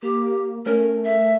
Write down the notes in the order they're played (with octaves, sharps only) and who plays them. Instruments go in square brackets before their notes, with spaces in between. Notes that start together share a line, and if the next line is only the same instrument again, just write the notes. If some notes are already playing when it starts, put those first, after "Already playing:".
[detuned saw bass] A#3 [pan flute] G4
[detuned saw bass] A3 [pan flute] C#4 [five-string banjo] A#4 C#5
[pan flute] E5